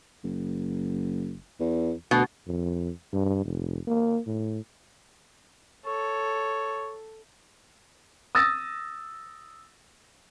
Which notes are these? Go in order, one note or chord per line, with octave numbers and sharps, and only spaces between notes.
F#1
E2
D2 B2
F2
G2
F1
A#3
A2
A4 C#5
D#6 E6 A6 A#6